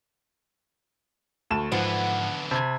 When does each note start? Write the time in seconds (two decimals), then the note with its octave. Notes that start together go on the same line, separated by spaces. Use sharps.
1.51 D2 A5 E7
1.72 G#2 D3 E3 F3 B3
2.51 C3 A5 B5 G#6